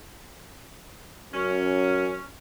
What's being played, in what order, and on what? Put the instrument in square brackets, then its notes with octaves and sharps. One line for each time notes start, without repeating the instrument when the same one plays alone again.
[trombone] F#2 [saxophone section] C#4